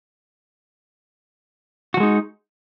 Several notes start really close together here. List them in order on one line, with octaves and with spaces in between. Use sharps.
F#4 F3 G#3 D#4